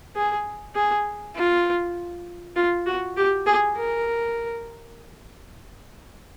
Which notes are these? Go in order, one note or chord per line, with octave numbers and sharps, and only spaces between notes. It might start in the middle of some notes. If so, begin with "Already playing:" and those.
G#4
G#4
F4
F4
F#4
G4
G#4
A#4